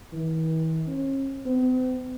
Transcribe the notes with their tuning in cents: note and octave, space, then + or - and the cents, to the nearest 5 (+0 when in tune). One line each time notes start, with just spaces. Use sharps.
E3 -40
C#4 -40
C4 -45